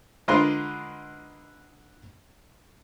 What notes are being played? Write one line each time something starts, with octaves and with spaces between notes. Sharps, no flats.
D3 G#3 F4 A#4 B4 C6